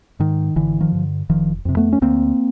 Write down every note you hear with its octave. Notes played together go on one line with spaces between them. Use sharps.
G#2 D#3
G#1 D3 E3
D#3 F3
G2 D3
F1 D#3 F3
F2 C3
A3 B3
C#4
D2 A#3 C4